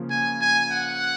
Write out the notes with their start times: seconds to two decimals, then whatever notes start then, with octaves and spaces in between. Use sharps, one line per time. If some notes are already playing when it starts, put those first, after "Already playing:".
Already playing: C#3 F3 A#3 F4
0.10 G#5
0.41 G#5
0.71 F#5